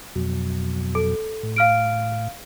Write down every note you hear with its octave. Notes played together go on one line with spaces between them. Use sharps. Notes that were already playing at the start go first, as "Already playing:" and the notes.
F2 B2 F#3
A4
A2
F5 F6 D7